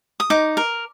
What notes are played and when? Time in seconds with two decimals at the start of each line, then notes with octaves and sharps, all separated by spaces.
0.20 D#6
0.30 D#4 D6
0.57 A#4